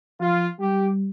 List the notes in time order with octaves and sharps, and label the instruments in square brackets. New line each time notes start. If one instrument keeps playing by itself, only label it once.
[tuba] F3 [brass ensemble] F4
[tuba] G3 [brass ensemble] G4